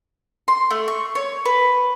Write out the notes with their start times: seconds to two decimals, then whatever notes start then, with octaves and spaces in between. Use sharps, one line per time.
0.48 C6
0.70 A3
0.88 C#6
1.15 C#5
1.45 B4